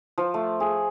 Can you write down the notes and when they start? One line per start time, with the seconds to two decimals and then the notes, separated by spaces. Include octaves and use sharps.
0.18 F3
0.34 A3
0.60 G#4